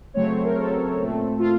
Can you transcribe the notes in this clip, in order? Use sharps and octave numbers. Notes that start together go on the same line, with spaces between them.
C#3 F#3 A3 C4 C#5
C5
A#4
C#3 F#3 A3 C4 A4
A#2 A3 C4
F4